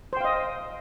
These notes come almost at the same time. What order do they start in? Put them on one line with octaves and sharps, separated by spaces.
C5 G5 F5 D#5